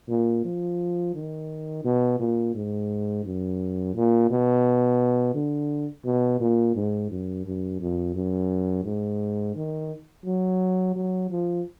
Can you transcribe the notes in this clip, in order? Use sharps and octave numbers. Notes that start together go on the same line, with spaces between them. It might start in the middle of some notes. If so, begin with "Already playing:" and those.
A#2
F3
D#3
B2
A#2
G#2
F#2
A#2
B2
D3
B2
A#2
G#2
F#2
F#2
F2
F#2
G#2
D#3
F#3
F#3
F3